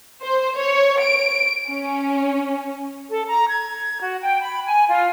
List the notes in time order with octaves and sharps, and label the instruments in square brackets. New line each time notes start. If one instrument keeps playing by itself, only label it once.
[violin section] C5
C#5
D7
C#4
[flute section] A4
A#5
G#6
F#4
G5
B5
G#5
F4